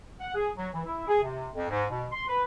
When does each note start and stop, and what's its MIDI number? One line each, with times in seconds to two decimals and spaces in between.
0.20 0.33 78
0.34 0.49 68
0.56 0.67 54
0.72 0.80 52
0.84 1.04 64
1.07 1.20 68
1.21 1.47 48
1.53 1.66 41
1.68 1.83 44
1.90 2.05 47
2.11 2.22 84
2.27 2.42 71